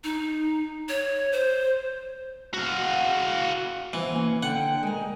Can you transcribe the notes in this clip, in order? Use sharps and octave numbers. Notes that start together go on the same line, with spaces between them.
D#4
C#5
C5
F#4 F5
E3 C4 F#5 G#5
A#3 C#4
D3 F#5 G5
G#3 A#4 G#5